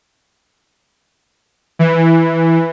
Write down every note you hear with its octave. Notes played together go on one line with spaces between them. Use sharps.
E3